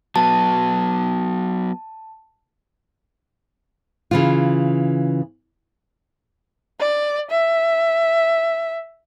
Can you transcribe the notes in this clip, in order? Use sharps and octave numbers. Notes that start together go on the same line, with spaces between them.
F#3 B3 A5
C#3 E3 F4
D5
E5